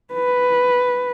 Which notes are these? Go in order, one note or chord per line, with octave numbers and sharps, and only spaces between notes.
B4